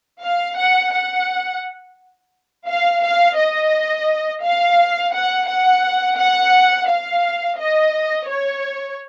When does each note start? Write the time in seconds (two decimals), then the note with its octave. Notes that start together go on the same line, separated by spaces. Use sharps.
0.23 F5
0.58 F#5
0.93 F#5
2.68 F5
3.03 F5
3.38 D#5
4.44 F5
5.14 F#5
5.48 F#5
6.18 F#5
6.88 F5
7.59 D#5
8.29 C#5